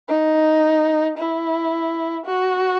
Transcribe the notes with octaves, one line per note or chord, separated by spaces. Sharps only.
D#4
E4
F#4